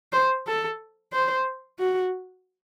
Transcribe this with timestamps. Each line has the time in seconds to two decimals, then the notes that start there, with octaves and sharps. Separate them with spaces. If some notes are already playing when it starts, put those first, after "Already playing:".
0.13 C5
0.47 A4
1.13 C5
1.79 F#4